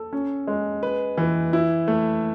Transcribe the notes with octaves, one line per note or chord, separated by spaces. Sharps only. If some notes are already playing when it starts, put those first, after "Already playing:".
Already playing: A4
C#4
G#3
B4
E3
E4
A3